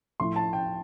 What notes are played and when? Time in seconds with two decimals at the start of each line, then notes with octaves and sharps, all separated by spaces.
0.20 A2 F3 A3 E4 C6
0.36 A5
0.53 G5